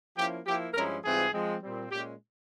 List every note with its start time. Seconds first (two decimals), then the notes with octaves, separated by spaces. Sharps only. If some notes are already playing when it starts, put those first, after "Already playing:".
0.16 F3 A#3 C#4 E4 G4
0.46 F3 A#3 E4 G4
0.74 G2 F3 G#3 C#4 E4 A#4
1.03 G#2 E3 G3 C4 F4 G#4
1.33 F3 G#3 C4
1.62 A#2 G3 C4
1.91 A#2 G#3 C#4 G4